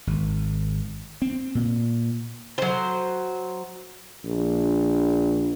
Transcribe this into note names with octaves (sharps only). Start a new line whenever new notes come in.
G#1
C4
A#2
F#3 C5
A#1